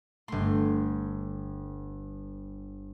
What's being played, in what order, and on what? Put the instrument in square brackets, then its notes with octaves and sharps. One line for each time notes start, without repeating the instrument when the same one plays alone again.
[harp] G1 C6 [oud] A3